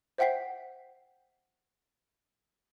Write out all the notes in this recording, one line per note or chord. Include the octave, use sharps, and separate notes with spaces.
C5 E5 F#5 G5 B6 C7